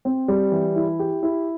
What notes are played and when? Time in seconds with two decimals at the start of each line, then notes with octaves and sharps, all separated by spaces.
0.05 C4
0.28 G3
0.52 E3
0.76 E4
0.99 G4
1.23 E4